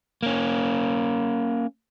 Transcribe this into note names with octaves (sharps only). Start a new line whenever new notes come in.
A#3 C#4